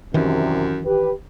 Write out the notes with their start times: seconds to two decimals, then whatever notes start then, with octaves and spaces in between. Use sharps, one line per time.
0.14 C2 F#2 C3 D#3 E3
0.85 G4 B4